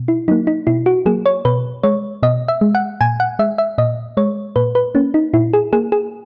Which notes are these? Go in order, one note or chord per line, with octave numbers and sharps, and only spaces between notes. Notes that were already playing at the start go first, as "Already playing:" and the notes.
Already playing: B2
E4
F#3 A#3 D#4
D#4
B2 E4
F#4
F#3 A#3 G#4
C#5
B2 B4
G#3 C#5
B2 D#5
E5
G#3
F#5
A#2 G#5
F#5
G#3 E5
E5
A#2 D#5
G#3 C#5
A#2 B4
B4
A#3 C#4
D#4
A#2 E4
G#4
A#3 G#4
G#4